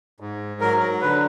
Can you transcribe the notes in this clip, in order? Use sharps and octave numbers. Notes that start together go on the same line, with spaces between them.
G#2
F#3 A#4
D3 B4